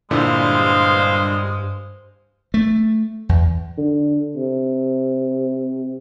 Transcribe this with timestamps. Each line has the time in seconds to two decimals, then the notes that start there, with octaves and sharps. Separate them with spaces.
0.11 G2 A#2 D3 G#3 E4 C5 F5
2.54 A3
3.29 E2
3.78 D3
4.36 C3